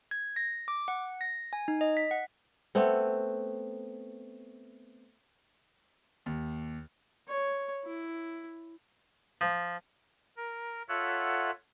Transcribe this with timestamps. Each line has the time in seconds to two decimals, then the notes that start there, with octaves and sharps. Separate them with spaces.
0.11 G#6
0.36 A#6
0.68 D6
0.88 F#5
1.21 A#6
1.53 G#5
1.68 D#4
1.81 D#5
1.97 B6
2.11 F#5
2.75 A3 B3 C4
6.26 D#2
7.29 C#5
7.84 E4
9.41 F3
10.37 A#4
10.89 F4 A4 C#5 E5 F#5